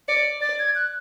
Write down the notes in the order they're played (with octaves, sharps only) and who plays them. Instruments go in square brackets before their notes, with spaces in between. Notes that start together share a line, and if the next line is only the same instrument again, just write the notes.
[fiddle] D5 [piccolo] C#7
[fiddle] D5 [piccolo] A6
[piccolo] G#6
F#6